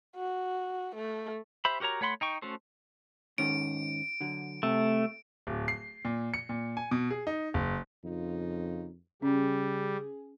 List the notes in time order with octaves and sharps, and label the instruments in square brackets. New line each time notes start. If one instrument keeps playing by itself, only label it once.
[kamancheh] F#4
A3
[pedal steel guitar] G4 C5 E5 B5
F#4 G4 A#4 C#5 A#5
A3 C#5 F#5 B5 C6
D#4 G5 C#6
A3 C#4 F#4 A4 C5
[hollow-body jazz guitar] G#2 D#3 C#4 [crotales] D7
[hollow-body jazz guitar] D3 F#3
[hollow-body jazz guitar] C3 [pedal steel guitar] A3
[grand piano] D1
C7
A#2
C#7
A#2
G#5
B2
G#4
D#4
F#1
[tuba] F2 [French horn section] C#3 D#4 F4
[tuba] C#3 [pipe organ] G3 [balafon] C#4 [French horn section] G#4